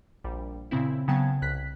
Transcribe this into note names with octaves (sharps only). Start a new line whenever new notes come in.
A#1 G3
A#2 C#3 C4 E4
C#3 F#3 B3 G5 A5 G#6
C2 F#6 B6